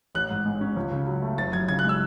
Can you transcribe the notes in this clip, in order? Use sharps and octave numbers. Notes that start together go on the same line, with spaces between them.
A1 F#6
G#2
G#3
C#4
C#2
C#3
F#3
A3
F#1 A6
F#2 G#6
C#3 G#6
G#3 F#6
E6